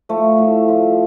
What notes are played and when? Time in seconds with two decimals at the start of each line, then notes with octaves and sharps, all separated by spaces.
0.09 F3 A3
0.38 A2
0.68 F3